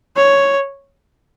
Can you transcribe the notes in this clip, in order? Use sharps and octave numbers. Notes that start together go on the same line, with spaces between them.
C#5